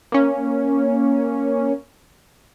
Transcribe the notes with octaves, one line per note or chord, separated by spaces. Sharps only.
A#3 C#4